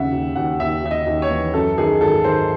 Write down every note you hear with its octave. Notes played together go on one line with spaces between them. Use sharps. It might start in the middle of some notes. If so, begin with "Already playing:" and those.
Already playing: D#2 C#3 E5 F#5
D#2
D#2 F#5
D#2 E5
D#2 E5
D#5
D#2
C#5
E3
F#2 A4
D#3 G#4
G#1 A4
D#3 C5